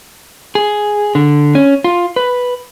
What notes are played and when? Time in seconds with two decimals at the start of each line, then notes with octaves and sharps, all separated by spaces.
0.55 G#4
1.15 D3
1.55 C#4
1.84 F4
2.16 B4